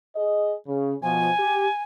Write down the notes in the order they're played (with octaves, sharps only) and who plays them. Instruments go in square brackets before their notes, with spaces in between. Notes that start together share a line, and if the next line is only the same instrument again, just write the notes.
[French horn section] G#4 D#5
C#3
[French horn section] B2 F3 [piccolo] G#5
[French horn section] G4